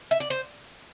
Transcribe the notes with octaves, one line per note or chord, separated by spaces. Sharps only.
E5
D5
C5